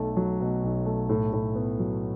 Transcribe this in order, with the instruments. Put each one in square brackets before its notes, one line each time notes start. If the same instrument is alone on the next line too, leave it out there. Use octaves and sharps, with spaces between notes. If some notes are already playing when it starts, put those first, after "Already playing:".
Already playing: [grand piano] B1 A3
F#3
B2
B1
A3
A2
A2
B3
F#3